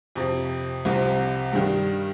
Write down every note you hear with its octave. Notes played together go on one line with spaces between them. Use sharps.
F2 C3 F3
C2 C3 F3 C4
G2 D#3 G3